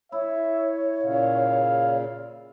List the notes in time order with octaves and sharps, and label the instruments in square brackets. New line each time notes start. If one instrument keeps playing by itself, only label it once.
[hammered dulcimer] E4 [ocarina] C#5 [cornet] E5
[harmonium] A#2 C#3 [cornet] F5